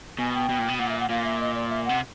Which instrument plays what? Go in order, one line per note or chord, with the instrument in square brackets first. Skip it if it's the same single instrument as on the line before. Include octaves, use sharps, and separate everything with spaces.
[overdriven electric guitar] B2 [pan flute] G#5
[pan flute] G5
[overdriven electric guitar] B2
A#2
B2
[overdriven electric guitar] A#2 [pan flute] F#5
[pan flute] E5
F#5
[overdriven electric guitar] A#2 [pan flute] F5
[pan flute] E5
D#5
D5
E5
[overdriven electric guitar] C3 [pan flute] F#5